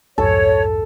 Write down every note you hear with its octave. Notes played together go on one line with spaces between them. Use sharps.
C2 F2 G#2 A4 C#5